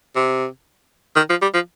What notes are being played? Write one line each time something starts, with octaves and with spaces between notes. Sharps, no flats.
C3
D#3
F3
G3
F3